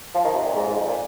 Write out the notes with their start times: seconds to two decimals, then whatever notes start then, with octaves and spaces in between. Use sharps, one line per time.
0.15 F3
0.25 D#3
0.35 C3
0.44 A#2
0.55 G#2
0.67 G#2
0.74 F2
0.87 A#2